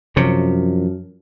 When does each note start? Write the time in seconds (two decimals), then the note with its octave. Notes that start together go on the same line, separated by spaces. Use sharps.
0.17 F#2 C3 F3 C#5